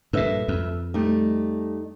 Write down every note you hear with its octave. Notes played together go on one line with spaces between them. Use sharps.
G2 A#2 A4 B4 E5
F2
G3 A3 D#4